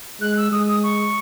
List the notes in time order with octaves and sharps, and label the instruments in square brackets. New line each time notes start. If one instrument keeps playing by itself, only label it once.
[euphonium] G#3 [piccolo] F#6
[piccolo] E6
[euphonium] G#3 [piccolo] D#6
[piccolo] D#6
C#6